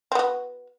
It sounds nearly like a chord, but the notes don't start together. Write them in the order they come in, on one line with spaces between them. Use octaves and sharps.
C4 B3 F#4